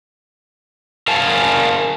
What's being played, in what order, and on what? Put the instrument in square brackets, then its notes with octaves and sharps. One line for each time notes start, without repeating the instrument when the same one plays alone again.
[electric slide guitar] A#4 F5 G#5 A5